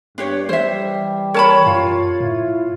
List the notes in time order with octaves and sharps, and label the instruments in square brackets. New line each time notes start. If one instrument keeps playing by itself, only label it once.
[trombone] G2 [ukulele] D4 G4 C#5
[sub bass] E3 [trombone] G3 [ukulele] C5 E5
[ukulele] A#4 A5 B5 [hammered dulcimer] C#5
[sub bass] F#2 [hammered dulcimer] F4
[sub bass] A2 [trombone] E4